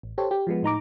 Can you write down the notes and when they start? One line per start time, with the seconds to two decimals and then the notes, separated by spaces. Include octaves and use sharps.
0.03 A1
0.18 G4 A4 C5 C#5
0.31 G4
0.47 F3 G#3 B3
0.63 A2 D#4 A#5 D6